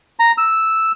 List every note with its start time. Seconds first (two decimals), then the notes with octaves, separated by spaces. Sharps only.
0.19 A#5
0.38 E6